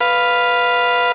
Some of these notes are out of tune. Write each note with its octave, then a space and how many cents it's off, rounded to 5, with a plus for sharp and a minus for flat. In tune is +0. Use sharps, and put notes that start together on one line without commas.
B4 +0 F5 +0